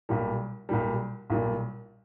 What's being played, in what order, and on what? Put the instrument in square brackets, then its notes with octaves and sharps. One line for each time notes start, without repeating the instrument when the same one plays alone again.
[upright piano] B1 A#2 G3
B1 A#2 G3
B1 A#2 G3